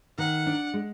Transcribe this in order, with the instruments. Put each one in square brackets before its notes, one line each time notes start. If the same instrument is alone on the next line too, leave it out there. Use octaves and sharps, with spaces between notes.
[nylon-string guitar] D#3 [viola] F#5
[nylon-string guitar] D4
G#3